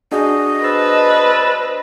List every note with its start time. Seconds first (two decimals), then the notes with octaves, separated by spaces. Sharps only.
0.12 D4 F#4 G#4 D#5
0.64 B4 C5 A5 E6